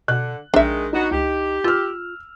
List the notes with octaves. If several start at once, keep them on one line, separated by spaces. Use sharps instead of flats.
B2 D3 F#6
A#1 D#3 G#3 D4 E5
F#3 B3 D#4 F#4
C#2 G4
F4 E6 F6